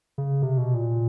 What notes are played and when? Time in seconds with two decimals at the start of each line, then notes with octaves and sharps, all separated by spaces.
0.18 C#3
0.42 C3
0.58 B2
0.74 A#2